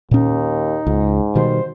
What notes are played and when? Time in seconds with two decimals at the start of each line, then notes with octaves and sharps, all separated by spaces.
0.11 D#2 A#2 C#4 D#4
0.87 C#2 G#2
1.35 B2 D#3 G3 C5